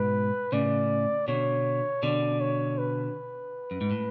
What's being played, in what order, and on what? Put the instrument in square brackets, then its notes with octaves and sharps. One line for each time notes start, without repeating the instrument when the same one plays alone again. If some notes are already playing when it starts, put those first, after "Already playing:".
Already playing: [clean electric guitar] G#2 B2 [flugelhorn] B4
[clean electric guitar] A2 C#3 [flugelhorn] D5
[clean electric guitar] B2 D3 [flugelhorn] C#5
[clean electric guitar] B2 D3 [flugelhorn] D5
[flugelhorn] C#5
B4
[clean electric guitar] F#2
G#2
A2